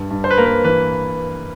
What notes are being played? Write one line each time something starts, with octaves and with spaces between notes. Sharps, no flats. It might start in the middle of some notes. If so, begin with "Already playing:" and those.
Already playing: G2
G2
C5
B4
A#3 A#4
B4
E3 B4